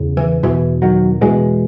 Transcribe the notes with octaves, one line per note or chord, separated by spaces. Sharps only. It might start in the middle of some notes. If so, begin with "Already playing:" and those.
Already playing: E2 C#3
E3
E2 B2 E3
D#3 F#3
E2 B2 E3 G#3